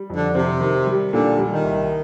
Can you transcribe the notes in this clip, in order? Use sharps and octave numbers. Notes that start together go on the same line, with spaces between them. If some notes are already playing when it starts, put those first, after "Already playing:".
Already playing: G3
F2
D3
C3 C4
D#3
G3
A#2 D3
G3
D#3
C2